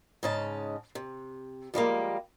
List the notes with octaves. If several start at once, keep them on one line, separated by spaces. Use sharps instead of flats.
G#2 C#3 C#4 D#5 A5
C3
F3 G3 G#3 A#3